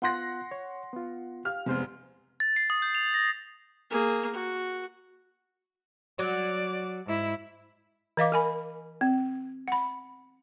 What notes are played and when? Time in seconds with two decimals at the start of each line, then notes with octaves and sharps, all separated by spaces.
0.02 B3 F4 F#5 C6 F#6 A#6
0.51 C#5
0.93 B3 F4
1.45 G4 F5 F6
1.66 F1 E2 C3 G#3 C5
2.40 A6
2.56 C7
2.70 D#6
2.82 G6
2.95 F7
3.14 A#6
3.91 A#3 G#4
4.34 F#4
6.19 F#3 D5
7.06 G#2 E4
8.17 E3 D#5 F5 D6
8.32 A#4 G#5 B5
9.01 C4
9.68 F#5 B5